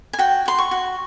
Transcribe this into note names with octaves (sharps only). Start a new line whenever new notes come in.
G#5
F#4 G5
F#4 C6
C#6
F#4